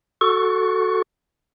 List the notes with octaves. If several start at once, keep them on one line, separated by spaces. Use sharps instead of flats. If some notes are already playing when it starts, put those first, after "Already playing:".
F#4 A4 C#6